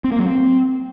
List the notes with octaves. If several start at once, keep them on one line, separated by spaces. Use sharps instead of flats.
C4
A#3
F#3
C4